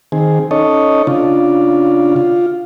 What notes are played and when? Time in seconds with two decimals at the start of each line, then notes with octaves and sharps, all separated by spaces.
0.12 D#3 C4 G#4
0.51 C#4 D#4 A4 C#5 D#5
1.07 C#3 D4 F4
2.16 F4